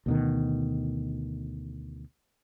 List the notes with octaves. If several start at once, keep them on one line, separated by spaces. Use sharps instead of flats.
D2 B2 D#3